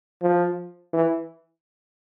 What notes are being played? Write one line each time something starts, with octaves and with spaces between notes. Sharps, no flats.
F3
E3